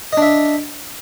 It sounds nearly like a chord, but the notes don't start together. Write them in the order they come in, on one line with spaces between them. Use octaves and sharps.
D#5 D4 E5